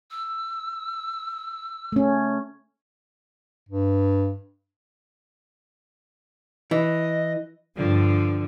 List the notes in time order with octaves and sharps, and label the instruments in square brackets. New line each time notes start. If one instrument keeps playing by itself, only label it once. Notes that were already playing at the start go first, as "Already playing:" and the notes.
[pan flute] E6
[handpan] A3 C#4
[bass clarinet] G2
[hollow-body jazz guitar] E3 [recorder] D#5
[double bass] G2 [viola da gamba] D3 F3